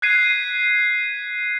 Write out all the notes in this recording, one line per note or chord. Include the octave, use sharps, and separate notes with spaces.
F#6 G#6 B6 C7 D#7